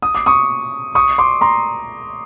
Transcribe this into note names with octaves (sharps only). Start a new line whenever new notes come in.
D#6
D6
C#6 D#6
C#6 D#6
C6 D6
A#5 C6